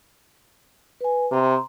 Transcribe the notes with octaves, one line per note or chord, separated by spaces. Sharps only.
B4 G#5
C3 A#5 C6